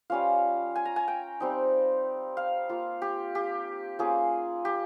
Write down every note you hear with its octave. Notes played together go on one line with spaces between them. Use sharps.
G3 C#4 F4 F5
G#5
A#5
G#5
G5
G3 C4 D#4
F5
A#3 F4
G4
G4
A#3 C#4 F4 G#4
G4